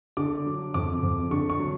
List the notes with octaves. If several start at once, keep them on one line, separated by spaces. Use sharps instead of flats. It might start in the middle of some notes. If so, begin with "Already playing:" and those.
D3 D6
F#3
F2 D6
F2
D3 C#6
C#6
F#3